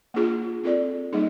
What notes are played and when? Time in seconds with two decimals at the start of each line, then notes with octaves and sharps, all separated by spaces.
0.14 A#3 D4 F4 G#4
0.63 C4 F4 A4 D5
1.13 G3 A#3 D#4 G#4